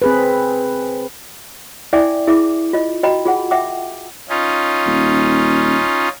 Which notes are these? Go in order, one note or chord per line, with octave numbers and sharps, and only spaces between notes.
C4 G#4 B4
E4 D5 E5 G5 G#5 D6
E4 G#4 E5 D6
F4 D#5
F#4 D#5 G5 A#5 B5
F4 G#4 F#5
E5 F#5 G5 D6
C#4 D#4 F4
D#1